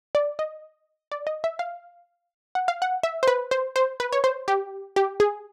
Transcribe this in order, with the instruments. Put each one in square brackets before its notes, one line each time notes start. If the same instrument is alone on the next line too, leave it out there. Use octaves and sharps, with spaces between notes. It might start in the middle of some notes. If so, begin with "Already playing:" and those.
[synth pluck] D5
D#5
D5
D#5
E5
F5
F#5
F5
F#5
E5
C5
B4
C5
C5
B4
C#5
C5
G4
G4
G#4